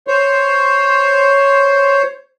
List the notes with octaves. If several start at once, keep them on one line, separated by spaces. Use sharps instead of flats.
C5 C#5